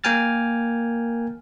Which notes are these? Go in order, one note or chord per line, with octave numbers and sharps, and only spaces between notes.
A#3 A#4 G5 G#5 F6 A6